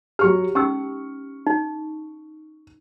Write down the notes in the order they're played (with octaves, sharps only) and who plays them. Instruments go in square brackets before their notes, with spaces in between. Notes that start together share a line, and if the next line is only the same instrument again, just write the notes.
[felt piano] F#3 C#6 F6 [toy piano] G4
[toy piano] C#4 D#4 E6 [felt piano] C#6
[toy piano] D#4